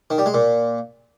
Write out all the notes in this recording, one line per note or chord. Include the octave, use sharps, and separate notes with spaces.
D#3
G3
G#3
A#2